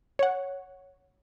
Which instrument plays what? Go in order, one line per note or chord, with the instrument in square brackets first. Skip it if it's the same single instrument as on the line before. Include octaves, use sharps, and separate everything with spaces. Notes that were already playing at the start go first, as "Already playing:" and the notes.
[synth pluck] C#5 F#5